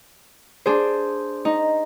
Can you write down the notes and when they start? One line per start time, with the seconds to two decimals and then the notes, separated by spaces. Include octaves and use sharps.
0.66 D4 G#4 C5
1.45 D#4